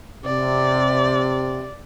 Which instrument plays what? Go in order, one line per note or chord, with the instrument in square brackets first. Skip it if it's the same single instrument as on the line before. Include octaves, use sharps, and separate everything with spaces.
[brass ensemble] C3 [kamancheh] D5